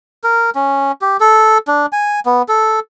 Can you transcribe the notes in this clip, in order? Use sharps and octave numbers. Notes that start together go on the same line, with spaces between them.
A#4
C#4
G4
A4
D4
G#5
B3
A4